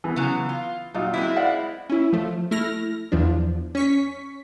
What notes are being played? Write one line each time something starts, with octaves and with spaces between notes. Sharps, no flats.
E3 B3
C#3 F#3
F4
A#2 F#3 D#4 F4
G#3 C4 E4
D5 F5 F#5
C#4 E4
F3 A3
A3 E4 F6 A#6
E2 F3 D4
C#4 C#6 B6